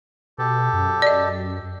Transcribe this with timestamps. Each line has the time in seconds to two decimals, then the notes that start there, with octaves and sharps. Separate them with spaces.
0.38 B2 G4 A4
0.73 F#2
1.02 D5 D#5